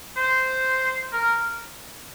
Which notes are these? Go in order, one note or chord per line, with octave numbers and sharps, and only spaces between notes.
C5
A#4